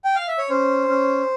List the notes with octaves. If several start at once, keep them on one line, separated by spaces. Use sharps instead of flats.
G5
F5
E5
C#5
C#4 C5
C#4